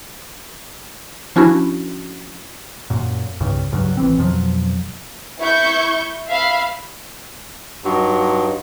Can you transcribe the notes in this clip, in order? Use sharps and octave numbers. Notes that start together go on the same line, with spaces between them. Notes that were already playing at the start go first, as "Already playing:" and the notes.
F3 C#4 D4 E4 F#4
F#2 A#2
C2 G2 C#3
C#2 G2 C#3 F#3
A1 E3 C4
F2 B2 F3 F#3
E4 C#6 G6
E5 F5 B5
G2 F#3 D#4 F4